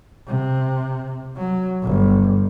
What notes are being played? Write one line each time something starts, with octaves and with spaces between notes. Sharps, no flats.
C3
F#3
G1